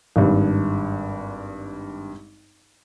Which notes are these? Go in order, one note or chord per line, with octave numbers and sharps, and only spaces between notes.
G#1 G2